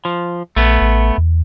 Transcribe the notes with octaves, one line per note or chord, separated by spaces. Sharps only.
F3
A#1 A3 B3
A1
E2